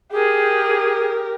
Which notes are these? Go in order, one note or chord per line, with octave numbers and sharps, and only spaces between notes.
G4 G#4 A#4